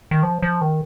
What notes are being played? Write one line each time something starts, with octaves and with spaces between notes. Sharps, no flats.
D#3
F3
F3
D#3